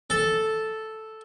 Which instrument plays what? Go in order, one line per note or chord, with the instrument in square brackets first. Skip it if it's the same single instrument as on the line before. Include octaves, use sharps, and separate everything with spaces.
[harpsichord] A4